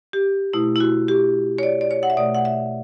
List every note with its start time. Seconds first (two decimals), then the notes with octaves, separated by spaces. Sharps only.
0.13 G4
0.53 B2 A3 E4
0.76 E4
0.80 F#4
1.09 G4
1.58 C#5
1.63 D5
1.81 D5
1.91 C#5
2.03 F#5
2.10 E5
2.17 B2 A3 D5
2.35 F#5
2.45 E5